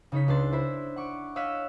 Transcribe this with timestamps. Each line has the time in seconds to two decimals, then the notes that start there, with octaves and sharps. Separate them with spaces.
0.12 C#3 D#4 C#5 B6
0.28 C#2 D4 C6 A6
0.52 E4 C5 B5
0.96 F#5 C#6 D6
1.36 C#5 D#5 F5 E6 F#6 B6